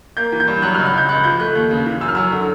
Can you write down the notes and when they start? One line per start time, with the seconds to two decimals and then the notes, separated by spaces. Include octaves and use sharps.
0.17 A#3 G6
0.32 E3
0.40 G6
0.48 G2
0.62 F#3 F#6
0.74 C#2 F6
0.86 F#6
0.94 C#2 G6
1.09 C#2 F#6
1.24 F3 G6
1.39 A3 F#6
1.55 D#2
1.71 C#3
1.86 E3
2.01 F#2 E6
2.08 F6
2.15 F#3 E6
2.32 D3